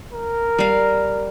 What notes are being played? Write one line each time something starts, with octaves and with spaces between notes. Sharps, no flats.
A#4
G3 F5